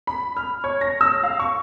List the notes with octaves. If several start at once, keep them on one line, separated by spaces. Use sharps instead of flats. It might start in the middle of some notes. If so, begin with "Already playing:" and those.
B5
F6
C#5
A#6
E6
F5
C#6